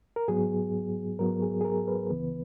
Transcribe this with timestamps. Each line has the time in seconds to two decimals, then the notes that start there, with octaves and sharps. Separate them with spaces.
0.16 A#4
0.28 G#2 F#3 B3 G#4
1.19 G#2 F#3 B3 A#4
1.42 G#4
1.61 G#4
1.65 A#4
1.88 B4
2.10 C#2 C#3 E3 B3